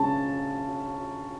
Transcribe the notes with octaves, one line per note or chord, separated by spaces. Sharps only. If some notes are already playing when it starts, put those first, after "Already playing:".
Already playing: C#3 G#3 C#4 A5